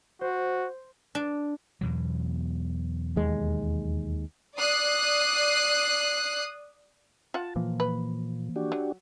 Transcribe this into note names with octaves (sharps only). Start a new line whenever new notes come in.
F#4 C5
D4
E2 B2 F#3
D#2 G#3
D5 D#6 F#6 C7
F4 F#5 A5
A#2 E3 F3 A#3
B4
D4 F#4 G4
F#3